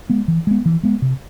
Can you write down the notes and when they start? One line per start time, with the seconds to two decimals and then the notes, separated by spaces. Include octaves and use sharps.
0.10 G#3 B3
0.28 E3
0.47 G#3 B3
0.66 E3
0.83 G#3 B3
1.02 C3